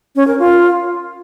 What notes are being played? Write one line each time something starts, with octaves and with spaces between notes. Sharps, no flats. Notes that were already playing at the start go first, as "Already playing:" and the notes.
C#4
A#4
F4